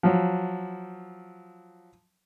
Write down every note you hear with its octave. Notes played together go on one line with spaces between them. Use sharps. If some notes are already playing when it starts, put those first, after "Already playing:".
F3 F#3